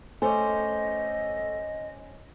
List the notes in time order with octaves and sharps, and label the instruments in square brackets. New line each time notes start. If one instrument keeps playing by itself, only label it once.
[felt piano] A3 [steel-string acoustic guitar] C#4 C5 [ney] D#5 [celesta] G#5 D6